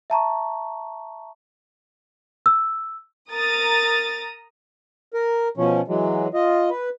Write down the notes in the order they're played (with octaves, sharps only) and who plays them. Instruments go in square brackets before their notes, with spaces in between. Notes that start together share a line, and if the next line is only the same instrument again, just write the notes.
[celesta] E5 A5 A#5 C#6
E6
[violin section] A#4 A#5 D#6 A6
[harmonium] A#4
B2 F3 C#4
E3 F#3 G#3
F4 D#5
B4